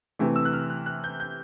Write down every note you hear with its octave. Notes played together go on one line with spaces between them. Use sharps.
C3 E3 A3
E6
F#6
F6
F#6
F#6
G6
G6